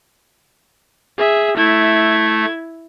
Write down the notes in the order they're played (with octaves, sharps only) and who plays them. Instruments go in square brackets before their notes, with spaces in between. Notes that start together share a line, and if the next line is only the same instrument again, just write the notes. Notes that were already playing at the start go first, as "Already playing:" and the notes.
[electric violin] G#4 E5
[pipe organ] A3 [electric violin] E4 G#6